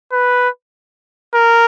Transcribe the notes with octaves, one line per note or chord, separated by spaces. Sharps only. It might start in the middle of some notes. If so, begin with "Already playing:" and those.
B4
A#4